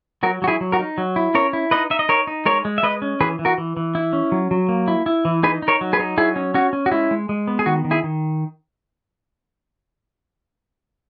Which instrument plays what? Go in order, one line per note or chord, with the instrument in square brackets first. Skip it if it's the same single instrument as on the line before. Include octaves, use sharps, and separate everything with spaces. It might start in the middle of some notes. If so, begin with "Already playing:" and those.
[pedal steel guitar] F#3 F#4 A#4
F#3 F#4
E4 G#4
F#3
F#4 A#4
D#4
F#3
E4
C#4 A#4 C#5
E4
D#4 B4 D#5
D#4 E5
D#5
D#4 A#4 C#5
D#4
G#3 A#4 C#5
G#3
E5
G#3 B4 D#5
C#4
E3 G#4 B4
E3
F#4 A#4
E3
E3
E4
C#4
F#3
F#3
A#3
E4
E4
E3
D#4 G#4 B4
D#4
A#4 C#5
F#3
G#4 B4
D#4
F#3 E4 G#4
C#4
C#4 F#4
C#4
F#4
G#3 E4
G#3
G#3
B3
G#4
D#3 F#4
D#3
E4 G#4
D#3